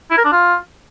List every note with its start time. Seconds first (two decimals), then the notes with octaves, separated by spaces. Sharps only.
0.10 E4
0.18 A#4
0.25 D4
0.32 F4